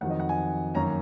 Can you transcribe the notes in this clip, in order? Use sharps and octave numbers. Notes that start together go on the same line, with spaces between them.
F2 D#3 F#3 F#5
D#5
F#5
G#5
F#2 D#3 A#3 C#4 A#5